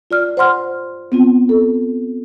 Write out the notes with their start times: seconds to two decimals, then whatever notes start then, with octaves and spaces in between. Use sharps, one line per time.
0.11 F4 D5 F6
0.37 C5 F#5 C6 F6
1.12 B3 C4 F4
1.49 A4